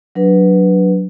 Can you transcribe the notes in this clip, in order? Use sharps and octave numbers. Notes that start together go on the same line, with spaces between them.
F#3 D4 B4